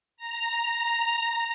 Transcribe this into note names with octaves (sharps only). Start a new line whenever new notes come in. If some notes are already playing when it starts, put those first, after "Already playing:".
A#5